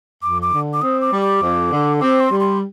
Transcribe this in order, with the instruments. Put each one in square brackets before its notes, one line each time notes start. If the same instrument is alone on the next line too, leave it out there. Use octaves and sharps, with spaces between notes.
[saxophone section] F2 [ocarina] D6
[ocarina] D6
[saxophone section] D3
[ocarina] D6
[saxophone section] C4 [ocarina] D#6
[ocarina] D6
[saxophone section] G3
[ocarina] D6
[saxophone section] F2
D3
[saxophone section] C4 [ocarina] D6
[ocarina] C6
[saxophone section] G3
[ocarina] C6